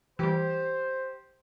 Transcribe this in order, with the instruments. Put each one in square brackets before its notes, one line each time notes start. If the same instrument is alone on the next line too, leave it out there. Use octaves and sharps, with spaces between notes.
[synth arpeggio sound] E3 G3 [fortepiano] G4 [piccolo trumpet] C5